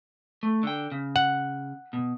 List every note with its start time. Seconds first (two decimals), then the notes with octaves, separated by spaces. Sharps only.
0.43 A3
0.63 D3 G5
0.92 C#3
1.16 F#5
1.93 B2